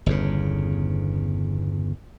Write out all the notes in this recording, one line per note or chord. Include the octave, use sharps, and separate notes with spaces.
G1 E2 C#3